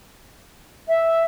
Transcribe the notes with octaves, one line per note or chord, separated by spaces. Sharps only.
E5